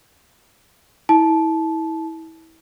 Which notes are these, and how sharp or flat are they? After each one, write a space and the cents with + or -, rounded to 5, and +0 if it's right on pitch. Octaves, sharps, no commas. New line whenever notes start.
E4 -30 A5 -20